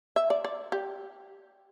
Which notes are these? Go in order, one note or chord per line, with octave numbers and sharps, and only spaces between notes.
E5
D5
D5
G4